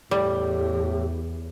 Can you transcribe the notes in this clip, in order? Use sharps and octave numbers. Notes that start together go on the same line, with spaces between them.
E2 A2 G3 G4